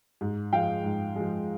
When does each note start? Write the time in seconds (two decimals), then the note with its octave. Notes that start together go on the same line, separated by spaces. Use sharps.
0.21 G#2
0.53 F3 G#3 F5 G5
0.84 G#2
1.16 F3 G#3